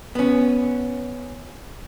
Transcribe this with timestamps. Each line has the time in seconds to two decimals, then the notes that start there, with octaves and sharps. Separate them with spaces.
0.15 B3 C#4